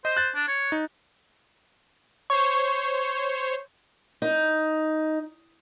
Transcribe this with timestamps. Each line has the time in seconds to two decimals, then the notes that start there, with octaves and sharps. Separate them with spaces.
0.05 C5 D#5
0.17 F#6 A6
0.35 D4
0.48 C#5
0.72 D#4
2.30 C5 C#5 C#6
4.22 D#4